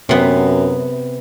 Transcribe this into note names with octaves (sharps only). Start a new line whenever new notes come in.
F#2 C3 B3